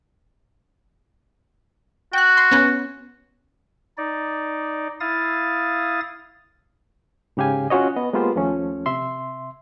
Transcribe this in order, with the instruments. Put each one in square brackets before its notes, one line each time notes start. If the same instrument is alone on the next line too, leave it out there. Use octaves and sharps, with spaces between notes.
[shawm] F#4 [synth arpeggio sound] G5 F#6
[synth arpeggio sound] C6
B3 C#4
[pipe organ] D#4 D5
E4 F5 D#6 A6
[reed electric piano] G#2 C#3 G4 F5 G#5
C#4 F4 F#4 C#5 D#5
B3 D#5
G#3 A#3 B3 F4 G4 C5
D#2 F3 A3 C#4
C3 E5 C6